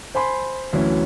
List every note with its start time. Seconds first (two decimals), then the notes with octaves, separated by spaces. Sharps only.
0.15 C5 G#5 B5 C6
0.73 D2 E3 F#3 C#4